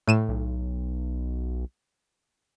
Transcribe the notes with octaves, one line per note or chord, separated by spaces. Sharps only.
A2 D#7 E7
B1